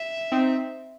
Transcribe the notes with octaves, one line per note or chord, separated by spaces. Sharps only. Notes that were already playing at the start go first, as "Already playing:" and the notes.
Already playing: E5
C4 D#4